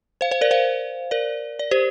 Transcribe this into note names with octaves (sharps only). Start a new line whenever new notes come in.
C5 F5
C5 F5
A#4 D5
C5 F5
A#4 D5
D5
G4 C5